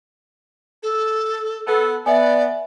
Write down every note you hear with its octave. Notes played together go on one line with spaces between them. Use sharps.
A4
B3 A4
B3 D5 E5 G#5